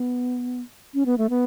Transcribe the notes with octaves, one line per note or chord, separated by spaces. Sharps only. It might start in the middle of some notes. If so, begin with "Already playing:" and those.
Already playing: B3
C#4
B3
A3
B3